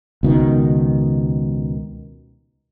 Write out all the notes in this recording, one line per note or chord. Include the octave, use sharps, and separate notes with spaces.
C#2 B2 D#3